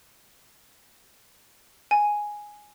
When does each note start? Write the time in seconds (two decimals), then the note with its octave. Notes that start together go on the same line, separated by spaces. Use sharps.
1.91 G#5